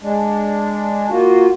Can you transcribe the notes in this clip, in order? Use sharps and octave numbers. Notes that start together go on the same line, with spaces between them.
G#3 D4
A#3 F4 F#4